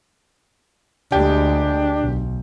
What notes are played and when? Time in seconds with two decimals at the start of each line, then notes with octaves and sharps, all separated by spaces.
1.12 D2 G#3 D4 G4
2.01 B1